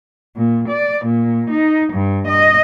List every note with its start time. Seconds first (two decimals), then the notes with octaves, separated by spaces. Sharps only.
0.36 A#2
0.69 D5
1.06 A#2
1.50 D#4
1.94 G2
2.28 D#5